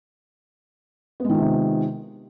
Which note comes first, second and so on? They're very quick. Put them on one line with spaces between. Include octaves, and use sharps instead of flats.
B3 G#3 D#3 F4 C3